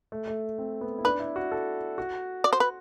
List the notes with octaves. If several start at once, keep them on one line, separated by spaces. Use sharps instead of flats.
A3
A3
C4
B3
E4
D4 B4
E4
F#4
A4
F#4
D5
C5
B4